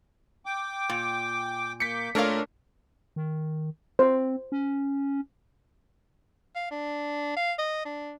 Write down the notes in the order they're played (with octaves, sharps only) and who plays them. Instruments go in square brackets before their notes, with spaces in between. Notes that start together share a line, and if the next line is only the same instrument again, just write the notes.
[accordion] G5 D6
[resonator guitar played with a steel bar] A#2
[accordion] A#3 D6 G6 [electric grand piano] B6 C#7
[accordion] A#2 C6 [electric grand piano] A3 A#4 [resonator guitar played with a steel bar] D4 C#5 F5
[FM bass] D#3
[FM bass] C4 [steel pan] C5
[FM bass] C#4
[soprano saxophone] F5
D4
F5
D#5
D4